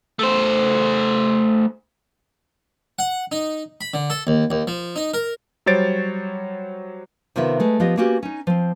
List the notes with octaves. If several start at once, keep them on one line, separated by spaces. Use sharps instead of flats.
A3 C5
F#5
D#4
B5
D3
A4
D#2
D#2
F3
D#4
A#4
F#3 G3 C5 C#5 A6 D7
C3 D#3 B3 F4 E5
G#3 A3 B4
F3 B3 G4 D#5
A#3 B3 C#4 F#4 G4
C#4 D#4
F3 C4